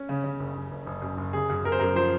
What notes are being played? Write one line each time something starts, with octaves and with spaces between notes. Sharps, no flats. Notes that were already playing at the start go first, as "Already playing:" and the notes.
Already playing: C#4
C#3
C#3
F#1
F#1
F#1
F#1
F#2
F#1
C#3 G#4
F#2
F#2 A#4
C5
F#2 A#4
F3 C5